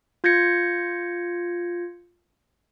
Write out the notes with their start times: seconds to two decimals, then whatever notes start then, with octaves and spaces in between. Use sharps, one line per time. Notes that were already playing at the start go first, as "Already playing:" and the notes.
0.24 F4 G6 G#6 A#6 C#7